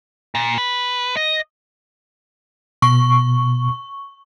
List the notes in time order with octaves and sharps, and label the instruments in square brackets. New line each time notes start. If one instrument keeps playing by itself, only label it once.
[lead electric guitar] A#2
B4
D#5
[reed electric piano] B2 [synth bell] C#6